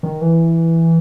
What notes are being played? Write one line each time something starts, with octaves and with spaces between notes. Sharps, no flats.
D#3
E3